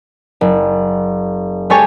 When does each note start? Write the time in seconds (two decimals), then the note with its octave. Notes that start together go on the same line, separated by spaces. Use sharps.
0.41 F#1
1.70 G#3 G4 A4 C#5 G#5